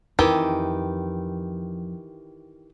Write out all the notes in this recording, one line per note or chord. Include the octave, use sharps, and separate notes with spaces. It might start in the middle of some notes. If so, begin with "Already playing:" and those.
F2 D#3 E3 G4